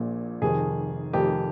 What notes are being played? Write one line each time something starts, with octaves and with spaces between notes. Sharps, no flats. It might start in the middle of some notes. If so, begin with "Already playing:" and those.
Already playing: A#1 A#2 F3
F1 F2 D#3 G#4
F1 F2 D#3 G4